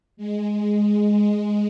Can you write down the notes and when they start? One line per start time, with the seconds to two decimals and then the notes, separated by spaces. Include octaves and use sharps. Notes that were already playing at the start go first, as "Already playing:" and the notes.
0.17 G#3
0.86 G#3
1.21 G#3